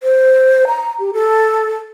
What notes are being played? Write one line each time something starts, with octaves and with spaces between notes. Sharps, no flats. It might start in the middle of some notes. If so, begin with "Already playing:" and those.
C5
A#5
G4
A4